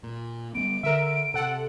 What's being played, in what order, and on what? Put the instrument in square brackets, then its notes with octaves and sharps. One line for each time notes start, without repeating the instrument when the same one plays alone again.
[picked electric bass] A#2
[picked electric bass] G3 A3 B3 [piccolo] D7
[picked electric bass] D3 [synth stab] A#4 E5
[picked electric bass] C3 [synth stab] A4 F#5